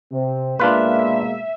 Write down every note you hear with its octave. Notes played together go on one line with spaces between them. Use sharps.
C3 C4
B2 G#3 A#3 D4 F4 B4 E5